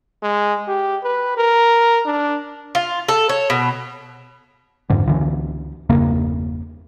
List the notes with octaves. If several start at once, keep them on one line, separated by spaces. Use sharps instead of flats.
G#3
G4
B4
A#4
D4
F4
A4
C#5
B2
F2 G#2 D3
C#2 D3 E3
G1 E2 C#3 A#3